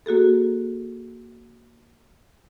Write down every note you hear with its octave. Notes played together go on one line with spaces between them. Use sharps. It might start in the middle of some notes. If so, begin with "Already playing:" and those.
A#3 F#4 G#4 A4